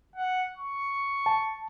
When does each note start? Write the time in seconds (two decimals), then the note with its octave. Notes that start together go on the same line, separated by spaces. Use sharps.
0.16 F#5
0.57 C#6
1.26 A5